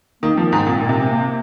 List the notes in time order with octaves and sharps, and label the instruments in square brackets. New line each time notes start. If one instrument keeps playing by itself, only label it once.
[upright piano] D#3 [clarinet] A#3
[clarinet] C4
[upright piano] F3
[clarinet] C4
[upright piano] G#2
[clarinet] D#4
[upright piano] A#2 [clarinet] C4
[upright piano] A#2
C3
[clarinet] A#3